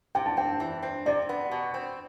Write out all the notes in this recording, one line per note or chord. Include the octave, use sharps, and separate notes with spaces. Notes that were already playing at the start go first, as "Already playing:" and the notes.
C3 G5
A5
C4 G5
E3
C4
C3 D5
B3
B2
C4